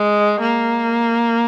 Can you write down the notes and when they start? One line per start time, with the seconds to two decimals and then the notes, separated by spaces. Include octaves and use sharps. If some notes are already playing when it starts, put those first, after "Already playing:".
Already playing: G#3
0.41 A#3